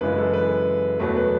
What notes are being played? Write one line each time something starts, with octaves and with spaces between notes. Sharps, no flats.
F#2 C#3 E3 G#3 B4
A4
B4
E2 B2 F#3 A3 B4
B4